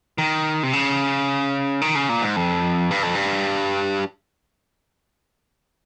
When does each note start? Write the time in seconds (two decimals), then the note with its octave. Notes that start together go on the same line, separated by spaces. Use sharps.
0.18 D#3
0.63 C3
0.73 C#3
1.81 D#3
1.95 C#3
2.09 A#2
2.22 G#2
2.36 F2
2.91 G2
3.03 F2
3.15 G2